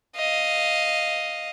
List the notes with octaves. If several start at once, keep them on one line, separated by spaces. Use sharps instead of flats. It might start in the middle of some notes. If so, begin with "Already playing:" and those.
D#5 F5